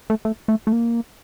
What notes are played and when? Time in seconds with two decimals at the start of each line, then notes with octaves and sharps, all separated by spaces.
0.10 A3
0.25 A3
0.48 A3
0.67 A3
0.72 A#3